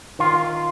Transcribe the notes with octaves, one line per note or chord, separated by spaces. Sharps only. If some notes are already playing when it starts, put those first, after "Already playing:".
D#3 F4